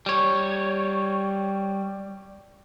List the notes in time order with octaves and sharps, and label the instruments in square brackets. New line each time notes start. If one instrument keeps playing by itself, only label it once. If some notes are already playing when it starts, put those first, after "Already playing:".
[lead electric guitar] G3 C#5